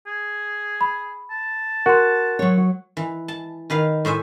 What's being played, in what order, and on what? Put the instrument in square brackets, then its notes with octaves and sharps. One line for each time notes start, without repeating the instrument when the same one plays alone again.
[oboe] G#4
[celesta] B5
[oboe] A5
[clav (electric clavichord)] F#4 [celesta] A#4 C6
[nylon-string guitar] F#3 C#5
[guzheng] E3
A5
D#3 B4 F5
A2 C5 E5 G#5